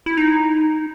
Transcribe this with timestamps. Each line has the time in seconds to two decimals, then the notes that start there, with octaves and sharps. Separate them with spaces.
0.06 E4
0.17 D#4